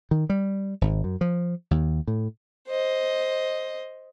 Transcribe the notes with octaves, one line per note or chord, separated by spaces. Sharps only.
D#3
G3
G#1
F#2
F3
D#2
A2
C5 D#5